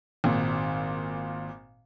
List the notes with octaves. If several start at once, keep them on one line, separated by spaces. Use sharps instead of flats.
G#1 A#2